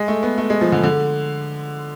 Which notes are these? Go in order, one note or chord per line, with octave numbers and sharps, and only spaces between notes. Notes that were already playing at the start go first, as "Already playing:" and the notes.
Already playing: G#3
A3
B3
A3
G#3
F3
D3
D3